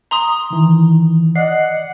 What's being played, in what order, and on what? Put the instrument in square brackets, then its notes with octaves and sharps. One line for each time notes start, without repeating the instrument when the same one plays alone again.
[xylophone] A#5 C6 D#6
[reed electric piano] D#3 E3
[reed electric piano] D5 D#5 [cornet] F#5 [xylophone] C7